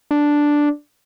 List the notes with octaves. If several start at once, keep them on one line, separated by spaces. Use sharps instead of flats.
D4